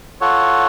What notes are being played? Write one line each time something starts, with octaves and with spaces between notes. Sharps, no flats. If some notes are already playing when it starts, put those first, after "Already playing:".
F4 A4 C#5 F#5